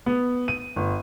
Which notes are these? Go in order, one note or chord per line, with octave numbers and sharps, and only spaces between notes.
B3
D#7
G1